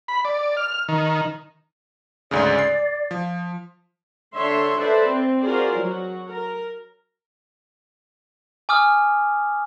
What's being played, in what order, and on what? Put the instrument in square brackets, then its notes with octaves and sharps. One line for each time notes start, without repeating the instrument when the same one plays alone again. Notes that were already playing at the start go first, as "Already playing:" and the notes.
[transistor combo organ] B5
D5
F6
D#3
[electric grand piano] D2 G#2 C#3 [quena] D5
[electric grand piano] C7
F3
[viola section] D3 D4 C#5 E5 C6
A4 B4 C5 D5 E5
C4
F4 F#4 G#4 A#4 C5 D5
F#3 F#4
A#4
[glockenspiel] G#5 D6 D#6 F6